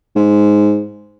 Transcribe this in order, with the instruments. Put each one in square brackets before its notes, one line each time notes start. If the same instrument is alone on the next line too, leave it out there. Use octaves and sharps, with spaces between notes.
[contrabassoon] G#2